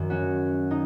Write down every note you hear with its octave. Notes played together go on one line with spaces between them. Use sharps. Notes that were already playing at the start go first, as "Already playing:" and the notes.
Already playing: F#2 D#3 F#3
C#4 F#4
D#4